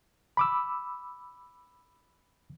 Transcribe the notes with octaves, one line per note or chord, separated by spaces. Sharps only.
B5 D6 E6